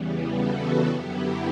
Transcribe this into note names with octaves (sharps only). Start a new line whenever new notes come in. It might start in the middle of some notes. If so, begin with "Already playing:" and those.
Already playing: E2 C#3 E3 G3 B3
F#4 A4
F#2 D3 F#3 B3 E4 G4